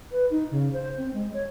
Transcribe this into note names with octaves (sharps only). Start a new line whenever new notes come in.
B4
D#4
C#3
C5
C4
G#3
C#5